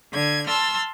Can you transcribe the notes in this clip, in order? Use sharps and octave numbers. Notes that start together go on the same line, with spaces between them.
D3 G#6
A5 C6 E6 F6